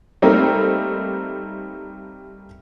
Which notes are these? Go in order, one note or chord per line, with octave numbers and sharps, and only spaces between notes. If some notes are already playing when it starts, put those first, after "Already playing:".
G3 A3 A#3 C4 D#4